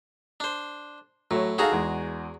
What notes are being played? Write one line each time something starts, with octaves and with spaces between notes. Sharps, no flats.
D4 C5
A2 F#3 C#5
D#4 F#4 G#4 A4 F5 A#5
E2 G#3